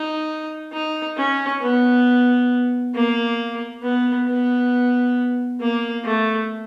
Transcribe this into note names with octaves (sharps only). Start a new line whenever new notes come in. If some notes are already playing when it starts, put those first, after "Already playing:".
Already playing: D#4
D#4
C#4
B3
A#3
B3
B3
A#3
A3